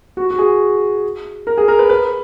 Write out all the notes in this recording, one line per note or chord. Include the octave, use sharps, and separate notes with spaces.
F#4
F#4
G#4
A#4
G#4
A#4
B4
B4